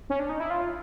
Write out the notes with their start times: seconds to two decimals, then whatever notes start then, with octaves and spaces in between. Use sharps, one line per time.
0.10 C#4
0.20 D4
0.29 D#4
0.40 E4
0.50 F4